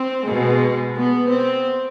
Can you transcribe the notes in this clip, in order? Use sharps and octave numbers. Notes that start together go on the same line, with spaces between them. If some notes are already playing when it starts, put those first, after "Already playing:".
Already playing: C4
B2 G#3
B3
C4